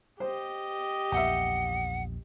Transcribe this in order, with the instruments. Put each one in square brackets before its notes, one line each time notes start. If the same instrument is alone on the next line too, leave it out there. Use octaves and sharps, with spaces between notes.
[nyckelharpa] G4 D#5 [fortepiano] C5
[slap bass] A#1 E2 [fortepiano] E5 G5 [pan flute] F#5